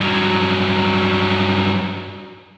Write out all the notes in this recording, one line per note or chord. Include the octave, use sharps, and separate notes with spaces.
G2 F#3